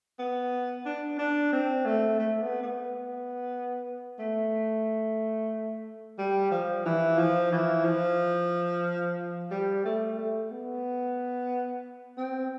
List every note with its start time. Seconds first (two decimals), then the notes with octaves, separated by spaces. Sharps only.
0.19 B3
0.86 D4
1.19 D4
1.52 C4
1.85 A3
2.19 A3
2.42 B3
2.63 B3
4.19 A3
6.19 G3
6.51 F3
6.86 E3
7.18 F3
7.52 E3
7.84 F3
9.51 G3
9.85 A3
10.19 A3
10.51 B3
12.17 C4